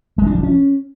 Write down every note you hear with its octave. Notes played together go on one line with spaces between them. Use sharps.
G#3
D4
F3
C#4